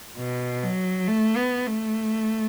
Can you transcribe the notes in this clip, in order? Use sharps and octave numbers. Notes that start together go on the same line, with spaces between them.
B2
F#3
A3
B3
A3